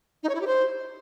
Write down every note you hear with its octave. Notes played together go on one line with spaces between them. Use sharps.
D#4
C#5
E4
G4
C5